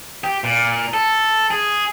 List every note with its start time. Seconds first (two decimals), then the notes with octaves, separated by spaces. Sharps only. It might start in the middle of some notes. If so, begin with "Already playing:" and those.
0.24 G4
0.44 A#2
0.94 A4
1.51 G#4